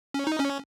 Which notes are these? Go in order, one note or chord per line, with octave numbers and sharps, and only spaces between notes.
C#4
D#4
C#4